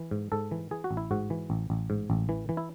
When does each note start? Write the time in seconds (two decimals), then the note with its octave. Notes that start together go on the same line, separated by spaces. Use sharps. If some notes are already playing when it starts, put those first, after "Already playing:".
Already playing: E3
0.11 G#2
0.32 G#2 A4
0.51 E3
0.71 E3 G#4
0.84 F#4
0.91 A1
0.97 E4
1.11 G#2 F#4
1.30 E3
1.50 A1
1.70 A1
1.90 G#2
2.10 A1
2.29 E3
2.49 E3
2.57 E4